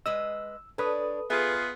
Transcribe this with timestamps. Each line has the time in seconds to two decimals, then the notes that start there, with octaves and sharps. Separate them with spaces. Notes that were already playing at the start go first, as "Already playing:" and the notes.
0.06 G#3 B4 D#5 E6
0.78 D4 A4 B4 C#5 D#6
1.30 B3 F4 G#4 E5